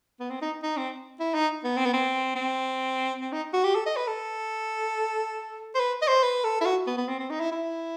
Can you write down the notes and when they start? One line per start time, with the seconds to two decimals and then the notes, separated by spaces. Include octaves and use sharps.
0.20 B3
0.31 C4
0.41 D#4
0.63 D#4
0.77 C4
1.20 E4
1.34 D#4
1.64 B3
1.77 C4
1.85 B3
1.93 C4
2.35 C4
3.21 C4
3.32 D#4
3.54 F#4
3.64 G4
3.75 A4
3.86 D#5
3.96 B4
4.07 A4
5.75 C5
5.79 B4
6.02 D#5
6.08 C5
6.23 B4
6.44 A4
6.61 E4
6.65 F#4
6.87 B3
6.97 B3
7.09 C4
7.19 C4
7.30 D#4
7.40 E4
7.52 E4